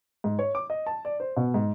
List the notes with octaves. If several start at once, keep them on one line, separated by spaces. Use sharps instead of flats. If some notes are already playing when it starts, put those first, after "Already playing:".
G#2
C#5
D6
D#5
A5
D5
C5
B2
G#2